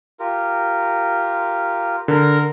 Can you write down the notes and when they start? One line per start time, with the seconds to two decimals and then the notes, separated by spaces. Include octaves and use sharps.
0.20 F4 G4 A#4
2.08 D3 A#4